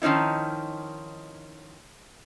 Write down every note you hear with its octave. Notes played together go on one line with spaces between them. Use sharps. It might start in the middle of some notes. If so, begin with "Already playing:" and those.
D#3 F3 C#4 D#4 E4